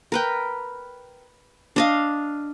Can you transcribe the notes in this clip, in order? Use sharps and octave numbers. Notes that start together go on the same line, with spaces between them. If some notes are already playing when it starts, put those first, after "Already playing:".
A#4 B4 G5
D4 D#5 F5